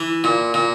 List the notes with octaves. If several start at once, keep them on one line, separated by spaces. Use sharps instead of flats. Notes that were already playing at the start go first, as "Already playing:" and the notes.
Already playing: E3
A#2
A#2